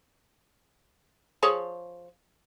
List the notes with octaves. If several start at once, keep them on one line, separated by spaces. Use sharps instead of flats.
F3 G#4 C#5